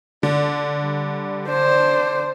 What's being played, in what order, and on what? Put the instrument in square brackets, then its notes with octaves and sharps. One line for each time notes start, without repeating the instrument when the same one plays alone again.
[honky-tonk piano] D3 [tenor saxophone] D4
[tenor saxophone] G3
[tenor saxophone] D4 [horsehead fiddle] C5